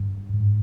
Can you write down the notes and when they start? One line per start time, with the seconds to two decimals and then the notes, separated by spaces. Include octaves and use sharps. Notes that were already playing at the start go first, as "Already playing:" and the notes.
Already playing: G2
0.34 G#2